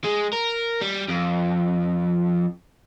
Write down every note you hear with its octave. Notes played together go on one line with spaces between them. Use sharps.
G#3
A#4
G3
F2